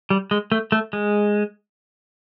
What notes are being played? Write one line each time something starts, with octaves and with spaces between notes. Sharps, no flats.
G3
G#3
A3
A3
G#3